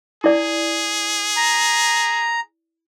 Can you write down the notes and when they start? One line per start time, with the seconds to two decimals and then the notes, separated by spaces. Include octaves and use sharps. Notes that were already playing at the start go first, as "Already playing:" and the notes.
0.24 E4 G#4 D5
1.37 A#5